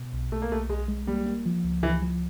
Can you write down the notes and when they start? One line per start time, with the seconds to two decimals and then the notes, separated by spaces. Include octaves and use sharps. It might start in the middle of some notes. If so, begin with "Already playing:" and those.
Already playing: B2
0.13 B1
0.31 B1 A3
0.42 A#3
0.50 B1 A3
0.69 B1 G#3
0.88 G#3
1.07 G3 A#3
1.26 A#3
1.46 F3
1.64 C#2
1.83 C#2 E3
2.02 F3